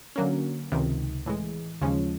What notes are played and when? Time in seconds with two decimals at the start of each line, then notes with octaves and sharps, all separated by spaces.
0.16 D3 F#3 A#3 C#4
0.72 C#2 C3 D#3
1.26 A2 E3 G#3
1.81 D#2 C#3 F3 G#3 C#4